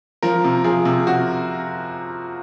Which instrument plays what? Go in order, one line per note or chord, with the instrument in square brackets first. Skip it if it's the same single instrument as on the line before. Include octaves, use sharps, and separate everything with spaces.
[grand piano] F3 A#4
C3
F3 G#4
C3
C3 F#4